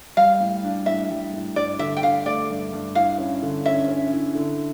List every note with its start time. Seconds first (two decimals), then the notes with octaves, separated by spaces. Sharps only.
0.17 G3 F5
0.40 A2
0.64 D4
0.86 A2 E5
1.10 G3
1.33 A2
1.56 G2 D5
1.79 D3 E5
1.97 G5
2.03 D3 F5
2.26 A3 D5
2.50 G2
2.73 G2
2.95 E4 F5
3.18 C#4
3.43 D3
3.66 C#4 E5
3.88 C#4
4.12 E4
4.35 D3